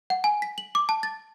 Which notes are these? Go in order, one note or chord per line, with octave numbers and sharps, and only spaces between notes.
F#5
G#5
B6
F#7
D6
A5
A6